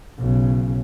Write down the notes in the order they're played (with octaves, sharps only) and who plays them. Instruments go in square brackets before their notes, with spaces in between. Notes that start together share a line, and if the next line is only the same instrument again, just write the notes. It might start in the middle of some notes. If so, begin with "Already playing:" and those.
[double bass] B1 C#3